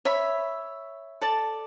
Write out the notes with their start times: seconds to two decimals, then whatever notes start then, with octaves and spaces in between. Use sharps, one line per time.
0.05 C#5 E5 B5
1.21 A4 D5 A5